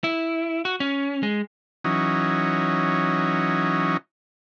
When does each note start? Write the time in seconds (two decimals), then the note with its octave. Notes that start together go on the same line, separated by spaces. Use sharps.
0.04 E4
0.65 F#4
0.80 C#4
1.23 G#3
1.84 E3 F#3 C#4 D#4